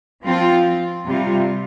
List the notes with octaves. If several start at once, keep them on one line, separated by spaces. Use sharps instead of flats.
F3 C4 F4
C3 G3 F4